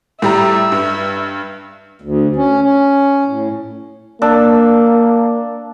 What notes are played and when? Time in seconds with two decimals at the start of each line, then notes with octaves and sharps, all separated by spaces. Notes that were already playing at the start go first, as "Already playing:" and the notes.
0.22 A2 G3 E5 A#5
0.72 G2
2.02 D2
2.36 C#4
2.62 C#4
3.27 A2
4.22 A#3 D4 E6